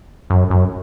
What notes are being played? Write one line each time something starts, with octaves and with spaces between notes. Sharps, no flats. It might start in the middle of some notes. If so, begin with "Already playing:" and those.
F#2
F#2